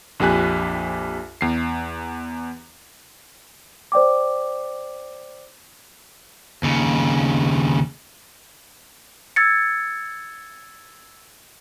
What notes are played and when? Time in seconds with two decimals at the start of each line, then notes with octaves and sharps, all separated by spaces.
0.20 A#1 F2 G4 G#5 F#6
1.41 E2 C7
3.92 C5 D5 G5 D6
6.63 D#2 C#3
9.36 E6 G#6 A6 C#7